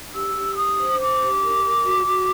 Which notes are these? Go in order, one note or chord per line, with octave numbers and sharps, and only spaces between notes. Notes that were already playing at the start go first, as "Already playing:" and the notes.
Already playing: D4
G4 E6
G4
D4 D#6
C5
D4 D6
G4
A#4
A#4
F#4
F#4